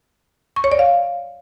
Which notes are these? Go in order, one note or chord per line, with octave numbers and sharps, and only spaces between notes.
C#6
C#5
D5
F5